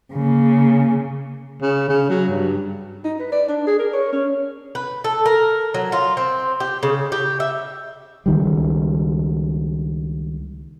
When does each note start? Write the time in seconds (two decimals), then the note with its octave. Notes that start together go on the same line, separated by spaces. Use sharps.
0.12 C#3 A#3
1.61 C#3
1.89 C#3
2.10 F#3
2.29 G2
3.04 D#4
3.20 B4
3.32 D5
3.48 D4
3.67 G#4
3.79 A#4
3.93 C#5
4.13 C#4
4.75 B4
5.04 A4
5.26 A#4
5.74 F#3
5.92 F4
6.17 C4
6.60 G4
6.83 C#3
7.12 G4
7.40 E5
8.26 C#2 D#3 G3